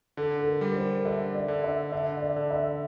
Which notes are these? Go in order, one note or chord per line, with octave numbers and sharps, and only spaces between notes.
D3 A4
A4
A#4
G3
A#4
C5
D3 E5
D5
D3
E5
D3 E5
E5
D5
D3
E5